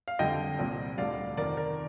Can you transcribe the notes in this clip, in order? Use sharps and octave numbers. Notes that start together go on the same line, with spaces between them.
F5
F2 D3 G3 D#5 G5
C2 A#2 G3
D2 D3 G3 D5 F5
F2 C3 D#3 A#4 D5
A#4 D5